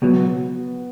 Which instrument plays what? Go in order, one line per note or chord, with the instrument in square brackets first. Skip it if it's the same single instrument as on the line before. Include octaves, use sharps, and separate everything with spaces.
[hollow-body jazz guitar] C#2 B2 F#3 [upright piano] B3